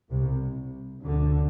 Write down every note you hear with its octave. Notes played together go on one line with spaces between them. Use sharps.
C2 C3
D2 D3